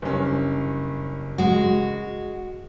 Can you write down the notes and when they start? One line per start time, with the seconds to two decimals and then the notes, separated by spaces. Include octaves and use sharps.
0.02 F#1 G2 C#4
1.38 G#3 F#4